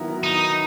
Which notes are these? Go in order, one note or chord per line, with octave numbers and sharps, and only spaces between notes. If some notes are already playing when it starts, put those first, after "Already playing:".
Already playing: D#3 F#3 B3 E4 A#4
D#4